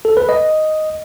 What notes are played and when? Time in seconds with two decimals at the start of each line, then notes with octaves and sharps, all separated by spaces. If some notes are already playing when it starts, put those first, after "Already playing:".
0.05 A4
0.17 B4
0.29 D#5